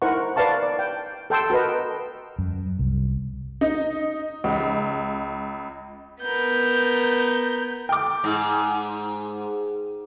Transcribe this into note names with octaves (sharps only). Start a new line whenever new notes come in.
D#4 E4 A#4 C5 F#5 C#6
A#4 B4 D5 F5 A5 C#6
D5
G5
A4 G5 C6 E6
F#4 A#4 B4 D#5
F#2
C2
D#4
C#2
B3 A#4 G6
G5 D6
G#2